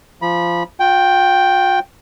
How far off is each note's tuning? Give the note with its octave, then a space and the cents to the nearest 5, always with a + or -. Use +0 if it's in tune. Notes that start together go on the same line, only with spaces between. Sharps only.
F3 -15 B5 -25
F4 +45 G5 +0